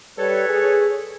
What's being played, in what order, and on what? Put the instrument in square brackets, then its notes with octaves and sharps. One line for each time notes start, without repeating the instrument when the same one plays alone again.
[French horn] G3 [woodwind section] A4 B4 C#5
[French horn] G#4